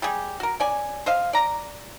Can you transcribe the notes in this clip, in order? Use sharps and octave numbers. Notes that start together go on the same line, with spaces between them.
G3 G4 G#4
F#4 A#4
C#4 D5 G#5
C5 D#5 F5
D5 A#5